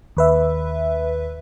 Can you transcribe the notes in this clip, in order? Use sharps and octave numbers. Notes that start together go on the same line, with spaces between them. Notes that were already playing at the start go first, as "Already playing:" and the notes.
D#2 B4 E5